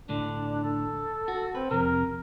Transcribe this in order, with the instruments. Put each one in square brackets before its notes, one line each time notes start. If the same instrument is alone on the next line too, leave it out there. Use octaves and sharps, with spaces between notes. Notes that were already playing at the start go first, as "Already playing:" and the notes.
[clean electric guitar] A2 D3 [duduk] D4
[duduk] A4
[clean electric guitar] F#4
[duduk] C4 [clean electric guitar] B4
[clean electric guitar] F2 C3 [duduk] A#4